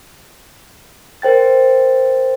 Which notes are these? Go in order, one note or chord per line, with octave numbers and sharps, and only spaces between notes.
A#4 C5 G5 A6